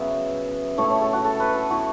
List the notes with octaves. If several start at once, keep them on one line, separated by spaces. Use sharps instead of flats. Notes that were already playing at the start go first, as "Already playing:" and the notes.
Already playing: C#3 F#3 B3 E5
A2 A3 E4 C#5
C#5
A4
F#4
A4
B4
A4
E3 B3 E4 F#4